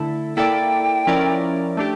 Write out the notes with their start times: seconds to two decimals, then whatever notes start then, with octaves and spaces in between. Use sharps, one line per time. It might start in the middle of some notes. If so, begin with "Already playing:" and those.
Already playing: D3 A3 E4 A4
0.37 A#3 E4 A4 D5 G5
1.07 F3 C#4 E4 A#4 D5
1.77 A3 D4 G4